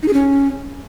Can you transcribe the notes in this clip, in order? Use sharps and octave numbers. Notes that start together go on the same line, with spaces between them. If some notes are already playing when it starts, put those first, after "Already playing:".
D#4
G#4
C#4